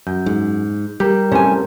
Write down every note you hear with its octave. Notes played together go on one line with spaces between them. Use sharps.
F#2 G6
G#2
G3 G4 A#4 A#5 G6
A2 C3 C#4 C5 G#5